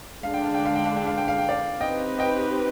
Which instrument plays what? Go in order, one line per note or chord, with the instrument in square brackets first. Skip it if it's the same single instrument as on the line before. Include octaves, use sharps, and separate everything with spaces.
[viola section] D3 G#3 D4 [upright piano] F5
[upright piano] G5
F5
G5
F5
G5
F5
G5
F5
G5
F5
G5
D5 F5
[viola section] C4 D#4 G4 B4 [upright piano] D#5 G5
[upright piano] D#5 G5